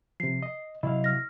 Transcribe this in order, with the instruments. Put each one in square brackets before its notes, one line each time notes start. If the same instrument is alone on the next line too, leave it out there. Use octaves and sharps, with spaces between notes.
[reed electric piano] C3 F3 [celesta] C7
[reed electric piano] D#5
[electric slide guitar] C3 F#3 F5 [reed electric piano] E4 [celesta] D#5
[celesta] F6 A#6